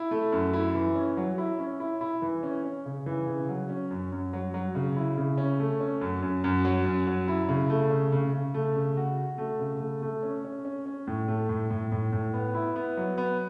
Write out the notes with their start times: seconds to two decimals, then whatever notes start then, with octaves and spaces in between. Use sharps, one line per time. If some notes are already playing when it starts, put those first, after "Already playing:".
Already playing: E4
0.11 A3
0.32 F#2
0.53 E4
0.74 E3
0.95 C#4
1.17 F#3
1.38 E4
1.59 C#4
1.80 E4
2.01 E4
2.22 E3
2.43 C#4
2.64 C#4
2.86 C#3
3.06 E3
3.27 C#3
3.49 F#3
3.69 C#4
3.91 F#2
4.12 F#2
4.33 F#3
4.54 F#3
4.75 C#3
4.96 E4
5.18 C#3
5.38 C#4
5.59 A3
5.80 C#4
6.01 F#2
6.22 F#2
6.44 F#2
6.65 F#3
6.85 F#2
7.07 F#3
7.28 E4
7.49 C#3
7.70 A3
7.91 C#3
8.12 C#3
8.33 C#3
8.54 A3
8.76 C#3
8.97 F#4
9.18 F#4
9.38 A3
9.59 C#3
9.80 A3
10.02 A3
10.23 C#4
10.44 C#4
10.65 C#4
10.86 C#4
11.07 A2
11.28 A3
11.49 A2
11.70 A2
11.92 A2
12.13 A2
12.33 B3
12.55 E4
12.76 B3
12.97 F#3
13.18 B3